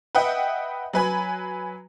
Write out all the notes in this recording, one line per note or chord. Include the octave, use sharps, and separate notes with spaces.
B4 D#5 E5 F#5 G5
F#3 B4 G#5 B5